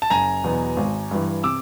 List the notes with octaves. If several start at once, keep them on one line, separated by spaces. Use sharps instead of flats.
A5
F#1 G#5 A#5
E2 B2 F#3 B3
G#1
G2 E3
C3 D6 E6